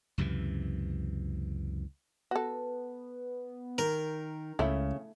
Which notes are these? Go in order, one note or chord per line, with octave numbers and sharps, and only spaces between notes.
C#2 F#2 C3 E3
B3 F#4 A4
D#3 A#4
C#2 C#3 A3 E4